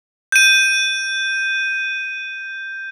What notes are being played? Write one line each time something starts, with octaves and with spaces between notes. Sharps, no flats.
G6 D#7